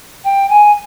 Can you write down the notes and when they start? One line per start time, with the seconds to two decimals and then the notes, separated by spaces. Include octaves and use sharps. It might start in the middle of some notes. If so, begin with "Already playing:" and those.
0.24 G5
0.49 G#5